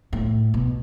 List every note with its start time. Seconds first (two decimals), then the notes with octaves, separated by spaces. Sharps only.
0.13 A2
0.54 B2